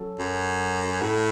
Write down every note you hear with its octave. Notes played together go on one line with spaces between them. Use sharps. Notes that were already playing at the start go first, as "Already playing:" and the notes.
Already playing: F#3 C#4 A4
F#2
A2